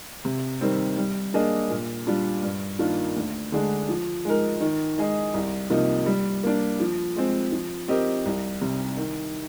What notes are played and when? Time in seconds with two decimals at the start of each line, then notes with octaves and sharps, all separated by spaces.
0.25 C3
0.61 D#3 G3 C4
0.97 G3
1.34 A#3 D4 G#4 D#5
1.70 A#2
2.07 G3 D4 F4
2.43 G2
2.79 D#3 A#3 D4 F4
3.16 D2
3.52 D3 G#3 D4 G#4
3.89 F3
4.25 G#3 D#4 A#4
4.61 D#3
4.98 G#3 D#4 G#4 D#5
5.34 C2
5.70 C3 F3 A#3 D#4
6.06 G3
6.44 A#3 D4
6.80 F3
7.16 G#3 C4
7.52 F3
7.88 C4 G4 A#4 D#5
8.26 C2
8.61 C3 G3
8.97 D#3